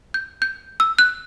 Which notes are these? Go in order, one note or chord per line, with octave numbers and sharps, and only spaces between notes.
G6
G6
E6
F#6